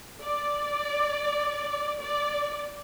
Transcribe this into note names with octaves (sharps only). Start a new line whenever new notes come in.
D5
D5